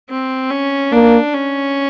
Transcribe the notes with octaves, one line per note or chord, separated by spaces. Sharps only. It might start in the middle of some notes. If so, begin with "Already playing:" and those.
C4
C#4
A#3 D4
C#4